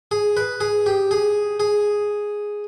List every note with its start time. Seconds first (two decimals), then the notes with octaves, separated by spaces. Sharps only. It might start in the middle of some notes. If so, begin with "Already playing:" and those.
0.11 G#4
0.37 B4
0.61 G#4
0.86 G4
1.11 G#4
1.60 G#4